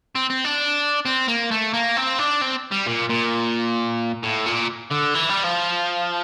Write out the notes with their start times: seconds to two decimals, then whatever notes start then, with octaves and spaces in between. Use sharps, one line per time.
0.15 C4
0.30 C4
0.45 D4
1.05 C4
1.28 A#3
1.51 A3
1.74 A#3
1.97 C4
2.19 D4
2.41 C4
2.72 G3
2.87 A#2
3.10 A#2
4.23 A2
4.46 A#2
4.91 D3
5.14 E3
5.29 G3
5.44 F3